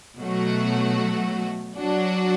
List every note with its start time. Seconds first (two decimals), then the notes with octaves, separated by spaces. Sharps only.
0.17 B2 F#3 A3 F#4
1.78 F#3 D4 F#4